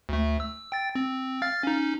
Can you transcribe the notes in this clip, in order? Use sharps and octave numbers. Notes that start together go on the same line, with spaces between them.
D2 A3
E6
G5 A6
C4
F5 F6 A6
C#4 D#4